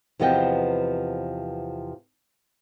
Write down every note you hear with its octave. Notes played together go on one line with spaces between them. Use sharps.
E2 C3 F3 B3 D#5 G5